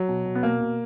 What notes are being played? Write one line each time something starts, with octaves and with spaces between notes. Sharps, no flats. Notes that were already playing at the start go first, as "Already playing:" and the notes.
Already playing: F#3
B2
B2
B3
B2 A#3
B2